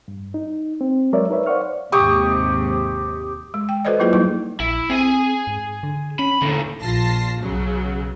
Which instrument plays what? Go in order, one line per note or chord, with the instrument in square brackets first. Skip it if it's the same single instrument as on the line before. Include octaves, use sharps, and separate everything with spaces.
[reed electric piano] G2
D#4
C4
F#3 G#3 A#4 C#5 D5 E5
D#4 A#4 B4 C#5 E5
C5 D5 F5 F#5 C#6 F6
[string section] D#2 G#2 C3 [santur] G4 C#6 D#6
[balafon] G#3
G5
F#4 A4 B4 C5 D5 D#5
F#3 A#3 E4 F4 G#4 B4
F#3 G3 A#3 D#4 E4
[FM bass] A#1 [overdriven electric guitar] E4
[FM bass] C4 [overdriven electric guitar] G#4 G#5
[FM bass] G#2
D3
[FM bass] C#4 [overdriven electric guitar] B5
[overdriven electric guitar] D#2 A2 [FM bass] D3
[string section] A#1 F4 A5 A#6 C7
B1 C#3 F#3